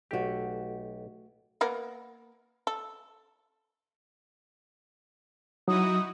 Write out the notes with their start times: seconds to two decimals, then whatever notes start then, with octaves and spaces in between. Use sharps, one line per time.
0.11 B1 A3 F#4 G4
1.61 A#3 B3 A#4
2.67 A4
5.68 F#3 D#4 E4 F#4 D#6